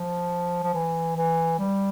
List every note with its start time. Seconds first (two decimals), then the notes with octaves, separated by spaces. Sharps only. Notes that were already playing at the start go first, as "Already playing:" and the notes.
Already playing: F3
0.63 F3
0.74 E3
1.17 E3
1.59 G3